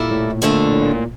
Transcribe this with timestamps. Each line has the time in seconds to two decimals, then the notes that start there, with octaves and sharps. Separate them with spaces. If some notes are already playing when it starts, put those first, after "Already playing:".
Already playing: A#2 G3 A#3 E4 A4 E5
0.11 A2
0.42 F2 A#2 D3 A3 D4
0.72 A2
0.82 A#2
0.93 A#2